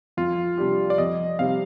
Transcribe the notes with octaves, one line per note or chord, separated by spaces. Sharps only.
F2 F4
C3 G3 D4 G4
D5
F2 D#5
C3 G3 C4 F5